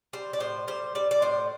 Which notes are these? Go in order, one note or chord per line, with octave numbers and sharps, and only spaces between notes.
G3 C5
D5
A2 C5
G3 C5
G3 D5
D5
A2 C5